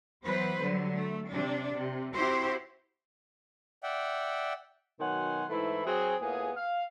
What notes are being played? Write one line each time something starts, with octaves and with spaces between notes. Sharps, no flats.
E3 F#3 B3 B4 C5
D3 F#3 G3
A3
C3 D4
C3
C4 E4 F#4 G4 C5
D5 E5 F#5 G5
B2 D#3 F#3 F#5 G#5 C6
G#2 E3 A3 E4 B5
F#3 C4 F#4 G#4
A2 A#3 B3 F4 G#4
F5